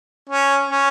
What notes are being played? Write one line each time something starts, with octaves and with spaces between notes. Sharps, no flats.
C#4
C#4